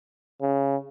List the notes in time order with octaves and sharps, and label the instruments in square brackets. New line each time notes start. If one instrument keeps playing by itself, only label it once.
[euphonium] C#3